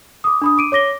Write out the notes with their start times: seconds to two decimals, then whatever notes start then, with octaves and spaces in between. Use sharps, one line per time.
0.24 D6 D#6
0.42 D4 B5 D#6
0.58 D6 D7 D#7
0.72 C#5 D6 A#6 G7